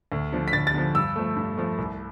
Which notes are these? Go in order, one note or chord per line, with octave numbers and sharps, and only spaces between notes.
D2
D3 F3
B6
D2 A6
A6
D3 F3
G2 E6
F3 A3
G2
F3 A3
C2